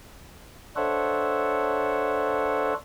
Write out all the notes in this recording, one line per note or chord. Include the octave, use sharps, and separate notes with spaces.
D4 A4 C5 C#5 E5 F#5